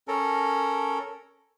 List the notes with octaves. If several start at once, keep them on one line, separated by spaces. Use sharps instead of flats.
C#4 A4 A#4